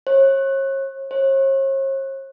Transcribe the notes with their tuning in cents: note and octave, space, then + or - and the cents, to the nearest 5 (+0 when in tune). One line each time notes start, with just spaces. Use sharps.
C#5 -40
C#5 -45